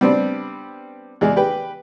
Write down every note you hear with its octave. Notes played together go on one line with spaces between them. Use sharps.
G3 B3 C4 D4
E2 G#3 D5
G4 B4 G5